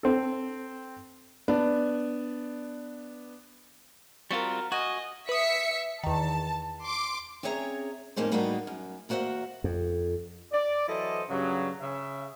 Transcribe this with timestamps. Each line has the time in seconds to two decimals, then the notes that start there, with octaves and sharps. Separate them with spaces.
0.03 C4 A4
1.48 B3 D4 D5
4.31 G3 C4 F4 F#4 A#4
4.72 F#4 D#5 G#5
5.29 B4 E5 D#6 B6 C#7
6.04 E2 D#3 A5
6.83 C6 D6
7.43 C4 C#4 G#4 C#5 E5 A#5
8.16 F2 A2 A#3 C#4 D#4 C5
8.32 A2 G3 A#3 B3 D#4 F#4
8.67 F#2
9.09 E2 A#3 F#4 C5 E5 F#5
9.64 F2
10.52 D5
10.88 E3 F#3 E4 A4 C5 D#5
11.30 G2 C#3 F#3
11.82 C#3 E5